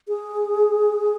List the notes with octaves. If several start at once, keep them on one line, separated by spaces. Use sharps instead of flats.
G#4